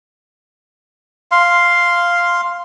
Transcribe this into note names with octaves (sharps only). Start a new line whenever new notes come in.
F5 C6